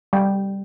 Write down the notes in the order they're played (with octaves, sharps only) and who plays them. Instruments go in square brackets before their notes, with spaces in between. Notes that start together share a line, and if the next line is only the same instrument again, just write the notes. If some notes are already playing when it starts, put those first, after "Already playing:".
[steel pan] G3 G5